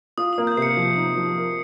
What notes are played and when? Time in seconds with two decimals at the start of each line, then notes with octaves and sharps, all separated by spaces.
0.18 F4 D#6
0.33 D#6
0.38 A#3
0.47 G6
0.57 C3 C7
0.62 C#7
0.77 F3
0.97 D#4
1.17 F3
1.37 A#4